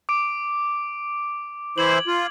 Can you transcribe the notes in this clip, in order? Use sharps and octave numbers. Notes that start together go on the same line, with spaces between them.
D6 D7
E3 E4 C5 G#6 F#7
F4